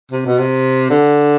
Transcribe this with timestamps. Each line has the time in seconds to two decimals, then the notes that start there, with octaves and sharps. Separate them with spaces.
0.11 C3
0.25 B2
0.38 C3
0.90 D3